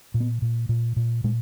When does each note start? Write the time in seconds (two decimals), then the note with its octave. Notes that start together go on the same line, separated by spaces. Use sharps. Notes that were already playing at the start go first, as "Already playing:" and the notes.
0.14 A#2
0.20 B3
0.42 A#2
0.69 A#2
0.96 A#2
1.24 A#2 G#3